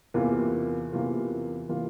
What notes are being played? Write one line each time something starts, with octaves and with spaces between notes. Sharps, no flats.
E2 C3 E3 A#3 F4
E2 C3 E3 A#3 F4
C3 E3 A#3 F4